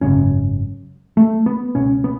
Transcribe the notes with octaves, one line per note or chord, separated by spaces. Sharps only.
G#1 F#2 C#3 C#4
A3
B3
C#2 B2 C#4
B3